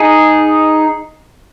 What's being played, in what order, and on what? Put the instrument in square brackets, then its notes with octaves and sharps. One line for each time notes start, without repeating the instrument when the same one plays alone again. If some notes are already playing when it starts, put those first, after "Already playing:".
Already playing: [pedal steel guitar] D#4 G#4